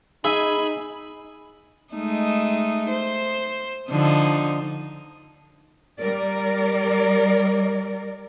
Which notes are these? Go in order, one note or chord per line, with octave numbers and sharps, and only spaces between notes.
D#4 G#4 E5 G#5 B5
G#3 A3 D#4
C5
D3 F3 D#4
G3 A#4 D5